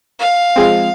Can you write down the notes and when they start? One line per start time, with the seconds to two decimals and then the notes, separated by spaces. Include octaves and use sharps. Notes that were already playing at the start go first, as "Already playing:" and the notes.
0.20 F5
0.56 F3 G#3 C4